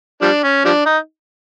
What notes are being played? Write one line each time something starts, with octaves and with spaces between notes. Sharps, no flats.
F3 G3 D4
C#4
F3 G3 D4
D#4